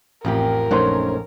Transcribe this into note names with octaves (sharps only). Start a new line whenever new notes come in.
A1 F2 F3 G4 A#4
A#1 F#2 A3 C#4 D#4 C5 F#5